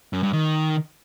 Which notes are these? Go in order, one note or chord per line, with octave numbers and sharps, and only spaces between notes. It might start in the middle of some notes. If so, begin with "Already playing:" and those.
F#2
G2
D#3